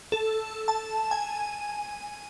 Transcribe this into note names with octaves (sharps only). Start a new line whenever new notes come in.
A4
A5
G#5